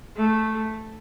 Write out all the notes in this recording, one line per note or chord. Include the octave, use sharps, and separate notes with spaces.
A3